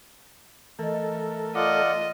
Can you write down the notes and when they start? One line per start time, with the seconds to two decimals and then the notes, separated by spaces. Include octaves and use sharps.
0.79 E3 A3 A4 A#4 D#5
1.55 F4 D5 D#5 F#5 D6